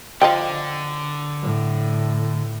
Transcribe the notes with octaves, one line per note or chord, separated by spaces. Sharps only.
D3 F3 D#5 G5
A2